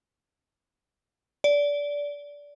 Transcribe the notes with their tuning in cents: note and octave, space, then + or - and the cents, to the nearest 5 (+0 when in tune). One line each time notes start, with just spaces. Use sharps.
D5 -20